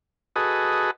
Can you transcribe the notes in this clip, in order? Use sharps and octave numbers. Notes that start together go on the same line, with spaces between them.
F#4 G#4 A4 B4 D#5